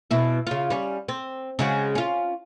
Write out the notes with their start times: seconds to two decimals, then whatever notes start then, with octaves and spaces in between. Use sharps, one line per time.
0.11 B2 E4
0.47 C#3 F4
0.70 G3 C#4
1.08 C4
1.59 C#3 G#3 F#4
1.95 C#4 F4